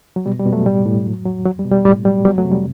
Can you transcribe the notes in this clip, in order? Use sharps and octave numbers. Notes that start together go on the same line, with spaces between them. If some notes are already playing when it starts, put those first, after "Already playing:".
F#3
B2 G3
G3
B2
F#3 A3
A2 G3
A2
F#3
F#3
F#3
G3
B2
G3
A2 G3
F#3 G3
F#3 G3 B3
F#3 A3
C3
G3